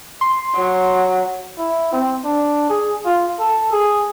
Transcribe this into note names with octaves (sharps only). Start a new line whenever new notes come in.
C6
F#3
E4
C4
D4
G#4
F4
A4
G#4